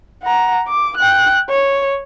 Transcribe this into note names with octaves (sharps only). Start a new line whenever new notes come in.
F#5 A#5
D6
G5 F#6
C#5